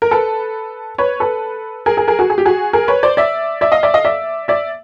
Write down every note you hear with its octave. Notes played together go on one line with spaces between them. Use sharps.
A#4
A4 B4
B4 C#5
A4 B4
G#4 A#4
G#4 A#4
G#4 A#4
F#4 G#4
G#4
G4
F#4 G#4
G#4 A#4
B4 C#5
C5 D5
D5 E5
D5 E5
D#5 F5
D5 E5
D#5 F5
D5 E5
D5 E5